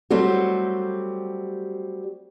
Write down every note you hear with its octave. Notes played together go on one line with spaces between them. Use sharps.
F#3 G3 A3 C4 F#4 G4